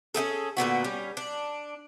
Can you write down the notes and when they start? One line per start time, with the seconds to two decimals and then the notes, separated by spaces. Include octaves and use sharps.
0.14 C#4 E4 G#4 A4
0.57 A#2 D3 B3 F#4
0.84 G3 C#4
1.17 D4